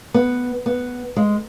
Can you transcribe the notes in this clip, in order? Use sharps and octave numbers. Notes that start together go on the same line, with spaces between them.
B3
B3
G#3